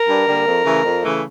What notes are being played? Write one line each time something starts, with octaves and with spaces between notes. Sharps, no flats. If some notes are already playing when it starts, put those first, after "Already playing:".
Already playing: A#4
G2
D3 G3 A#3
F2
C#3 E3 A3
F2
C#3 E3 A3